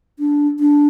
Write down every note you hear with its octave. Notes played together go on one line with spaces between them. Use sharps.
D4
D4